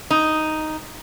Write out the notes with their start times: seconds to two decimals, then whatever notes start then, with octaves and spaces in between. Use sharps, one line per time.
0.11 D#4